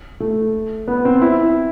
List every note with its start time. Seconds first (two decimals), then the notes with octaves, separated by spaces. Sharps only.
0.20 A3
0.88 B3
1.05 C4
1.22 E4